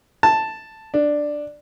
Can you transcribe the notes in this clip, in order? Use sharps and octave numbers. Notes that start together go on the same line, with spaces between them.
A5
D4